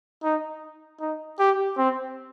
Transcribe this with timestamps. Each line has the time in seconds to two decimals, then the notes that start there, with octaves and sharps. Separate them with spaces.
0.24 D#4
1.01 D#4
1.39 G4
1.77 C4